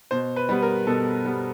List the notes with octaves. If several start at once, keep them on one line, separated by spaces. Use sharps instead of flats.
B2 C5
B4
G3 B3
A#4
B2 A4
G3 B3